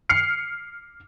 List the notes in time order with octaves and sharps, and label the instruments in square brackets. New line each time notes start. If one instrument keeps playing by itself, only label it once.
[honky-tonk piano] F6 C7 C#7